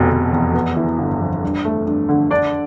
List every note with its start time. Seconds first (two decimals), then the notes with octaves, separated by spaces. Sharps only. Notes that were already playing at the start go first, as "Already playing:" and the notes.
Already playing: F1 F2 B2
0.11 F1
0.32 E2
0.54 B3
0.77 E3
0.99 G1
1.21 F2
1.43 G2
1.65 A3
1.86 G2
2.09 D3
2.31 D4 D5